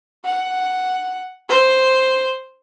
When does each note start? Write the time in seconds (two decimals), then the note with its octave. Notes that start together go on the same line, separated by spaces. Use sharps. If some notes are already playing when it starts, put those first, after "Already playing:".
0.25 F#5
1.49 C5